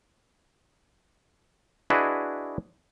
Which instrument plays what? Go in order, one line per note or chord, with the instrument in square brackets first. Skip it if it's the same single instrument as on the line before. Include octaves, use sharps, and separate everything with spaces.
[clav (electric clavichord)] D4 E4 F#4 G#4 B4 D#5